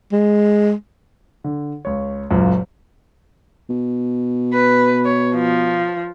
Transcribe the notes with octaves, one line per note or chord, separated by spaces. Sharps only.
G#3
D3
C#2 C#5
F#1 C#2 F#2 A#2
B2
B4
C#5
F3